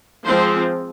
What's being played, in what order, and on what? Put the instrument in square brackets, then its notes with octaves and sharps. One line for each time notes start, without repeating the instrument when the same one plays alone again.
[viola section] F3 G#3 C4 C5